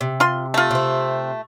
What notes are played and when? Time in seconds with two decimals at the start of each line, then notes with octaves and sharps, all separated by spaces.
0.01 C3
0.20 F4 C6
0.54 A3 F4
0.71 C3 C4